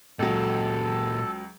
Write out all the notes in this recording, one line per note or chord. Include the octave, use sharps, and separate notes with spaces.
C#2 A#2 F#3 C#4 A4